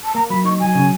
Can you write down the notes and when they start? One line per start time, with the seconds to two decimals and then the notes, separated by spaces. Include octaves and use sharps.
0.04 A5
0.15 A#3 A#5
0.30 F#3 B5
0.44 D#4 C#6
0.60 F#3 G#5
0.75 C#3